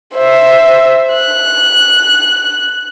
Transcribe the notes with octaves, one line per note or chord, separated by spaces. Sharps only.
C5 E5
F#6